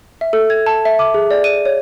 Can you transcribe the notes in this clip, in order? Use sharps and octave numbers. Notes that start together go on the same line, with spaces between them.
E5
A4
G#6
A5
E5
D6
G#4
D5
D#7
C#5